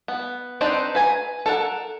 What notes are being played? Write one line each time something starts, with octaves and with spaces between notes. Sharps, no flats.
B3
C4 D4 D#4 B4 C5
B4 G#5 A#5
A4 A#4 F#5